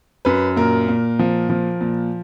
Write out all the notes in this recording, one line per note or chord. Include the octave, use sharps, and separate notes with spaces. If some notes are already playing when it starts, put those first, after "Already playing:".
F#2 B4
A#2 A#4
A#2
F3
F3
A#2